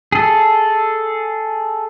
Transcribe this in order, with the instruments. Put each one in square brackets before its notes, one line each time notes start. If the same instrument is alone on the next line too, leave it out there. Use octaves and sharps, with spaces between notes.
[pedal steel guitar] G#4 A4